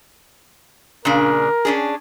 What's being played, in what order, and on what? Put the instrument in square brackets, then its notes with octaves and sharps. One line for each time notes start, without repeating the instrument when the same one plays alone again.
[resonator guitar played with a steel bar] A#2 C#3 D4 [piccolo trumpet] A#4
[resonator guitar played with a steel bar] C#4 D4 G#4